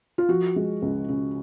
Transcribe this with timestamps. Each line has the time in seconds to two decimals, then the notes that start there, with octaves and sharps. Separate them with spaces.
0.18 F4
0.28 F3 F#4
0.56 G#3
0.82 C#2
1.09 C#3